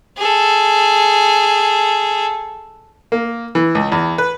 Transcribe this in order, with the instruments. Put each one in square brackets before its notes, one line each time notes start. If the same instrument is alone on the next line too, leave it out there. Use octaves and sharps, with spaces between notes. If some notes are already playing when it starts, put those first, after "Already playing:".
[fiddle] G#4 A4
[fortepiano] A#3
E3
C#2
E2
B4